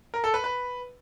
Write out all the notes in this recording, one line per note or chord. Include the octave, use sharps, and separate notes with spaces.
A#4
A4
B4
B4